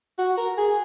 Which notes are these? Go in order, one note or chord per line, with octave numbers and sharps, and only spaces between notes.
F#4
A#4
G#4